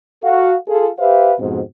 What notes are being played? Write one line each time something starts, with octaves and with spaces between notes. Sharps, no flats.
F#4 A4 F5
F4 G#4 A4
G4 B4 C5 E5 F5
F2 G#2 B2 C4